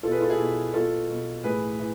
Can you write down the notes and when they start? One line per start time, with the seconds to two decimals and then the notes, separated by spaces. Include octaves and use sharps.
0.03 B2 F4 A4
0.12 G#4 B4
0.21 F4 A4
0.30 E4 G#4
0.38 B2
0.74 B2 F4 A4
1.09 B2
1.44 A2 E3 G#4 B4
1.79 E3